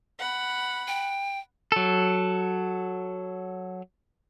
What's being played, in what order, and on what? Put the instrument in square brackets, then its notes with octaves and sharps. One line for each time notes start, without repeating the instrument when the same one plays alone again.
[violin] F#5 B5
[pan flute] G5
[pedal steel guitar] F#3 A4